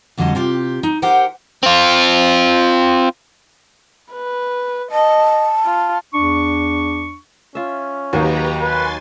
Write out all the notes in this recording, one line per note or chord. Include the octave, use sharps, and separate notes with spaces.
F2 D3 F#3 G3 D#5 A5
C3 F4 G4
D#4
D#4 G4 A#4 C5 F#5 G5
C4 F4
B4
D#5 A5
F4
E2 D4 C#6
C#4 F4 E5
D#2 F#3 A#3 D#4 G4 B4 A#5
B4 G#5 C6 A6